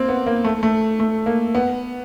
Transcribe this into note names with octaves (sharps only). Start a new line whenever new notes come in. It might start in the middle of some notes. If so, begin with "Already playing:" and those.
Already playing: A#3 C4
B3
A#3
A3
A3
A3
A#3
B3